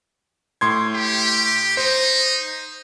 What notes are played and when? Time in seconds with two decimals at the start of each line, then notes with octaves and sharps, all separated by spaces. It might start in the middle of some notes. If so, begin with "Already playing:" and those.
0.61 A2 C6 G#6
0.94 G4
1.77 D#4 C5